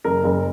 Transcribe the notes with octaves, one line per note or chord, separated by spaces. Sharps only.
F#1 A#4
F#1